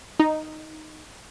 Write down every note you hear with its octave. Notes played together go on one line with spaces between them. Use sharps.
D#4